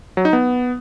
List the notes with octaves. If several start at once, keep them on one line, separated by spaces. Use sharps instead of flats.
F#3
D#4
B3